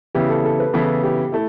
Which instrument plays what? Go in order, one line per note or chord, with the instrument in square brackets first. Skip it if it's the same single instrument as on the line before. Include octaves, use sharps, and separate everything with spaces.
[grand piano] C#3 E3 B3 E4 [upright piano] G4
[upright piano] A4
A4
B4
[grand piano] C#3 E3 B3 E4 [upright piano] A4
[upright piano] G4
[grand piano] A3 [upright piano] E4